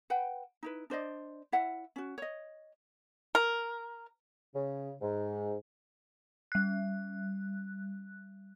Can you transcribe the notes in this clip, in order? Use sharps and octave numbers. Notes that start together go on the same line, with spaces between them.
B4 F#5 G5
D#4 E4 B4
D4 C5 D5 D#5
E4 C#5 E5 F#5
C#4 F#4
C#5 D#5
A#4
C#3
G#2
G3 F#6